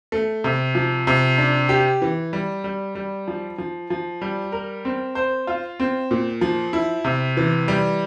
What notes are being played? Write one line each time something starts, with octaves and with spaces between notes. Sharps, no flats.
A3
C3
F3
C3
D4
G4
E3
G3
G3
G3
F3
F3
F3
G3
A#4
C4
C5
F4
C4
A#2
F3
E4
C3
E3
G3